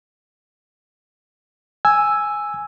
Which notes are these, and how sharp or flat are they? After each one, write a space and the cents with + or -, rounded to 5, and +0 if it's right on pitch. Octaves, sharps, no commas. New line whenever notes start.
G#5 +0 E6 +0